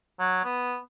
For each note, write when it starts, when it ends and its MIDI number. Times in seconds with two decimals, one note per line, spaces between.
0.20 0.41 54
0.45 0.78 59